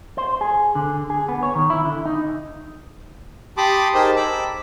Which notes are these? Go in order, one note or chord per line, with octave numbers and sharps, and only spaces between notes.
C5
G#4
D3
G#4
B3
C#5
D#3
E4
D3
D#4
G4 A5 B5 C6 D6 D#6
D#4 G#4 A#4 C5 G5 A5
B5 D6 E6